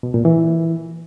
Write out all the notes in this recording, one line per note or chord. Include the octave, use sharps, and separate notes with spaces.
B2
A#2
E3